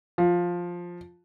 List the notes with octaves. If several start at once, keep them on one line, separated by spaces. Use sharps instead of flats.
F3